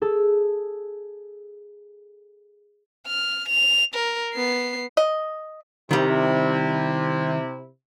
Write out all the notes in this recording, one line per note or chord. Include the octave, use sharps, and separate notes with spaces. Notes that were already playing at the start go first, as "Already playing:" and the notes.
G#4 A4
F6
F7
A#4
B3 C7
D#5
C3 D#3 G3 E4